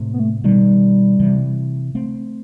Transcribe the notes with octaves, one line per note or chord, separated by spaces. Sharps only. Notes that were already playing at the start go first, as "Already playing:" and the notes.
Already playing: A2 C3
B3
A3
B2 D#3 G3
C3 E3
A3 C4